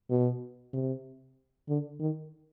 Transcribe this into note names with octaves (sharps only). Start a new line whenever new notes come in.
B2
C3
D3
D#3